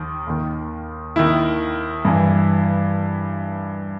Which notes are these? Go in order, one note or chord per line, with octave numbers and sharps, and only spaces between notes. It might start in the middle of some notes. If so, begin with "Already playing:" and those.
Already playing: D#2 D#3
D#2 D#3
D#2 D#3 E4
G2 E3